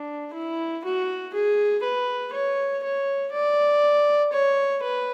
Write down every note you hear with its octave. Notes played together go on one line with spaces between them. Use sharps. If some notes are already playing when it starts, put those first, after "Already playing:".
Already playing: D4
E4
F#4
G#4
B4
C#5
C#5
D5
C#5
B4